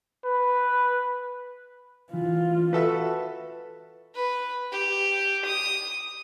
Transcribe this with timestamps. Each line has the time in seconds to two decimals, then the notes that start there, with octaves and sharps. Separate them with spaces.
0.25 B4
2.14 E3 F4
2.73 F#4 A4 B4 E5
4.15 B4
4.72 G4
5.45 D#6